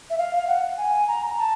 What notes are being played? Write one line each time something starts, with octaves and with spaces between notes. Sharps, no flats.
E5
F5
F5
F#5
G#5
A#5
A#5
A5